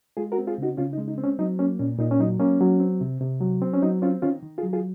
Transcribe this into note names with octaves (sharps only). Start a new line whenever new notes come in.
G#3 F4 G#4
F#4 A#4
C4
F4 G#4
C#3 D#4 F#4
C#3 C#4 F4
D#4
G#3
D#4
C4
C#4
F#3 D#4
A#3 C#4
A#2 C#4
A#2 D#4
C#4
F#3 D#4
A#3 C#4
F#3
C4
C3
C3
F#3
C4
C#4
F#3 D#4
C4 C#4 F4
D#3 C#4 F4
D#3
F4 G#4
F#3
F4 G#4